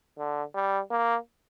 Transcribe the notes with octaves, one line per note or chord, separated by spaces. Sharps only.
D3
G3
A#3